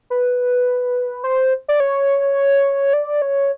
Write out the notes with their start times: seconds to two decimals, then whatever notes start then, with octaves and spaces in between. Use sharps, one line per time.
0.10 B4
1.24 C5
1.68 D5
1.80 C#5
2.93 D5
3.22 C#5